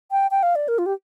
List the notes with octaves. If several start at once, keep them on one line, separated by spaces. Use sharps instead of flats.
G5
G5
F5
D5
A#4
F4
G4